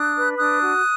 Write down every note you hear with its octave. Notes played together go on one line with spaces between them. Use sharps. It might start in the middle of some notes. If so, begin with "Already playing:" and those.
Already playing: D4 D#6 F#6
B4
D4 D#6 F#6
F#4